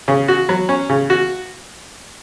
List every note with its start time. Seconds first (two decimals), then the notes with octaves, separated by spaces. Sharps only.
0.08 C#3
0.28 F#4
0.49 F#3
0.69 C#4
0.90 C#3
1.10 F#4